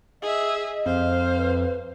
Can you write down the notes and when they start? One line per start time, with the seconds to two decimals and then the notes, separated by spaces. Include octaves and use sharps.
0.22 G#4 D#5 E5
0.86 F2 C5 F5
1.37 B4